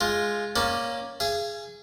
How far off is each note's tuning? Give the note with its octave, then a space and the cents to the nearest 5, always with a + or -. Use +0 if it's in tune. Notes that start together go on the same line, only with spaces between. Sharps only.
G#3 +0 F4 +0
A#3 +10 C#4 -10 D5 +0
G#4 +0 F5 -40